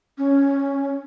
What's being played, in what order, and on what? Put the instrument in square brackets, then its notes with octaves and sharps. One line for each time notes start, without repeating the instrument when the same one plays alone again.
[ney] C#4